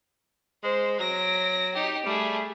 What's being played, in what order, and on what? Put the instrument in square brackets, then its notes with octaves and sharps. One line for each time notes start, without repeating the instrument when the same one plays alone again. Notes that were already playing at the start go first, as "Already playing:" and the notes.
[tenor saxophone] G#3 [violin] C5
[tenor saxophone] F#3 [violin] A#6 D7
[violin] D#4 G4
[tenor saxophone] G3 [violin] A3 G#4